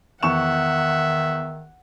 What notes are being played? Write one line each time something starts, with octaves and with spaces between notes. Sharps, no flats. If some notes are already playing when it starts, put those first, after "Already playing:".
E2 D#3 E5 F#5 C#6 E7